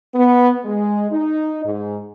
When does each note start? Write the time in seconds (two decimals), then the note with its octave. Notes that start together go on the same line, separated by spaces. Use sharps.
0.15 B3
0.65 G#3
1.11 D#4
1.64 G#2